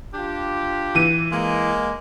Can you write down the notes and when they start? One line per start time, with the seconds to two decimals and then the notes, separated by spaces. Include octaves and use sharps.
0.14 D4 F4 G4
0.95 E3 D#7
1.31 G#3 A#3